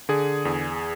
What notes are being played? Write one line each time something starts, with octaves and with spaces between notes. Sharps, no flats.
D3 G#4
E2